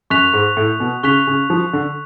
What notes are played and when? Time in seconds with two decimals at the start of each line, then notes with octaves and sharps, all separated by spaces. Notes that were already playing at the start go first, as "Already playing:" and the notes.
0.10 F#2 C#6 F#6 B6 F7
0.33 G#2
0.57 A2
0.80 B2
1.03 C#3 C#6 F#6 B6 F7
1.27 C#3
1.50 F3
1.73 D3